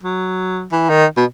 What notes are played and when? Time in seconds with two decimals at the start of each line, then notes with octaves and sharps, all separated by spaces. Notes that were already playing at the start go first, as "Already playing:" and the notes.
0.03 F#3
0.72 E3
0.90 D#3
1.17 B2